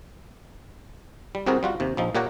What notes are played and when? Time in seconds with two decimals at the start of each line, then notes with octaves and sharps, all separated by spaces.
1.35 G3
1.46 C2 C3 C4 F#4 G#4 A#4
1.63 G3 F4 F#4
1.80 D#2 C3
1.97 A#1 F3 D#4
2.15 A#2 A#3 G4 C#5 F#5 A#5